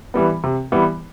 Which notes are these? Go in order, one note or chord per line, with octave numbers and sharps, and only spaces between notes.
E3 G3 B3
C3
E3 G3 B3